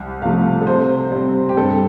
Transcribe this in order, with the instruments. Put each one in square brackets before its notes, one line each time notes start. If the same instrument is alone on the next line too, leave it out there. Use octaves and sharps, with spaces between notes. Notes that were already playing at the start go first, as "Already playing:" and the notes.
Already playing: [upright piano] C2
C3 F3 A3 F5
A4
C3 C5
G3 C4
G4
G2 A4